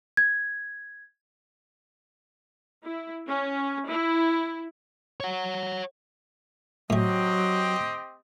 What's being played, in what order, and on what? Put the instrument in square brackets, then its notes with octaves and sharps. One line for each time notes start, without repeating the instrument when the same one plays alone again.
[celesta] G#6
[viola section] E4
C#4
E4
[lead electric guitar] C#5 F#5
[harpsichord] A2 A3 [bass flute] F#3 [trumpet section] C4 G4 D#5